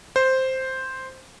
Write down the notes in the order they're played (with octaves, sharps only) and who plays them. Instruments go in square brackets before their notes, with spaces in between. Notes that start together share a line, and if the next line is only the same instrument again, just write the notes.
[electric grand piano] C5